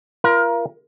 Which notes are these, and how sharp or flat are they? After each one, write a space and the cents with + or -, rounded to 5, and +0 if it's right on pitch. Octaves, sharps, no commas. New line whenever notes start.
F4 -35 A#4 +25